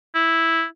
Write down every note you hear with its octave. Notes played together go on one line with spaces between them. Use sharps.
E4